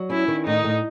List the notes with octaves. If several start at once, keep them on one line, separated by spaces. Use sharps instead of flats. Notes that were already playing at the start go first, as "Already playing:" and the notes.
Already playing: F#3
C#4 E4
D#3
A2 D#4
A2